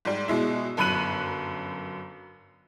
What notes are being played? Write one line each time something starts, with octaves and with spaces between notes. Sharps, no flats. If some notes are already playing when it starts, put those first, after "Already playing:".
G#2 G3
B2 G#3 E4
G1 F#2 B5 F#6 D#7 F#7